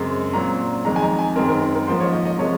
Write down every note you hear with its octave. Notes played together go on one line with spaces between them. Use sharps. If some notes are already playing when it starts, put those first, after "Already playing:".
Already playing: F#2 C#3 G#3 C4
A#2 F#3 C4 A#5
F2 D#3 G#3 A#5
G#5
A#5
G#5
F#2 D#3 G#3 C4 A#4
A#4
A#4
G#2 F3 A#3 C5
C#5
D#5
D#5
C3 F3 G#3 C#5